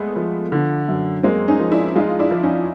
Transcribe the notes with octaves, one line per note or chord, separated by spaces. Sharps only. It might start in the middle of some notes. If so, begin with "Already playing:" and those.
Already playing: G#3 A3 B3
F3
D3
F#2
G#3 A#3 C4
C#4 D#4
F3
D4 E4
G#3 D#4 F4
D4 E4
F3
C#4 D#4